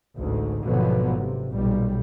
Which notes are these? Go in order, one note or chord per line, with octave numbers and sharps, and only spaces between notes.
A1 D2 G#2
G#1 B2 D3 F3 F#3 B3
C3
B1 A#2 G3